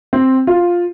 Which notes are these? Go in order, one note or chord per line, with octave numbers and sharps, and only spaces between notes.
C4
F4